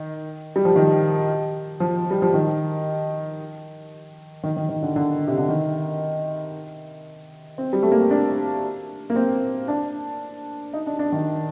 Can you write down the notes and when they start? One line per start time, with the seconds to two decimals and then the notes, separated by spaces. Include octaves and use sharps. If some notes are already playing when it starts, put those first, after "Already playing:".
Already playing: D#3
0.56 G3
0.65 F3
0.76 D#3
1.80 F3
2.11 G3
2.22 F3
2.34 D#3
4.43 D#3
4.57 D#3
4.69 D#3
4.83 D3
4.96 D3
5.27 C3
5.38 D3
5.48 D#3
7.58 C4
7.73 G3
7.83 A3
7.92 A#3
8.01 C4
8.11 D4
9.10 A#3
9.16 C4
9.68 D4
10.73 D#4
10.87 D4
10.99 D4
11.12 D#3